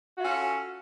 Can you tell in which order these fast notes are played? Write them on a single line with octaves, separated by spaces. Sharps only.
F#4 F4 C#4 A4